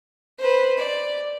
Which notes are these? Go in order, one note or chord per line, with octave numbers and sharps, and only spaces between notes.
B4 C5
D5